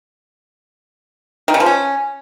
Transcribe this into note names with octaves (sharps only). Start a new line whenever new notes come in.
D#3
C#3
F3
C#4